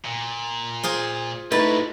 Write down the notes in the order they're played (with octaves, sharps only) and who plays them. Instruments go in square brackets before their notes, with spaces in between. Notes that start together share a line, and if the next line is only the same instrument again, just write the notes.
[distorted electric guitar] A#2
[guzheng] F4 G#4 C5
[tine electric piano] A3 D#4 E4 [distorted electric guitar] A#3 F#4 [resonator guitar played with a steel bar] B4 [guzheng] A5